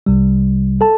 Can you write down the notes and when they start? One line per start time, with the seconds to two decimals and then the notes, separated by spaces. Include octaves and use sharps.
0.06 C2 C3 G3
0.81 A4 A5